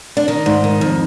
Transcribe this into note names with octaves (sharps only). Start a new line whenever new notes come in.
D4
D#3 D#4
G#2
D#3
F2